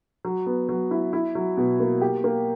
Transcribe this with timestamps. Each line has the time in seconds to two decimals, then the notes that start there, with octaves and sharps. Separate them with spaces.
0.25 F#3
0.47 B3
0.69 F#3
0.91 E4
1.13 E4
1.35 F#3
1.57 B2
1.80 A#3
2.01 G4
2.24 A#3